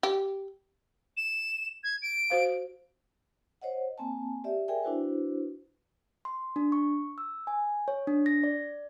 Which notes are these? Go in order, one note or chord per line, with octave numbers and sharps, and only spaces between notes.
G4
E7
G#6
D7
F#4 C5 F5
C5 C#5 D#5 F#5
A#3 C4 G#5 A5
G4 D5 E5
G#4 A#4 D5 E5 G5 G#5
D4 E4 F#4 B4 C5
C6
D4
C#6
E6
G#5
C#5
D4
A#6
D5